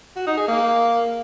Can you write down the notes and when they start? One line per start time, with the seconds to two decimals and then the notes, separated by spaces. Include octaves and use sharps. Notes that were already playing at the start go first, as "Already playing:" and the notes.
0.16 F#4
0.27 D#4
0.37 G#4
0.48 A#3